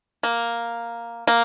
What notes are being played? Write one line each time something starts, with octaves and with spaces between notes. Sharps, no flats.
A#3
A#3